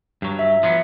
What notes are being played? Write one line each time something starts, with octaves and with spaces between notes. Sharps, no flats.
G2 F#3
E5
F3 F#3 B3